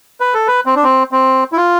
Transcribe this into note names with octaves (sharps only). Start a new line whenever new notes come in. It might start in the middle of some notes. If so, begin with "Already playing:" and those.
B4
A4
B4
C4
D4
C4
C4
E4
F4